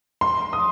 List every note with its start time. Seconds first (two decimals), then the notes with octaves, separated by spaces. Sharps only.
0.21 C6
0.53 D#6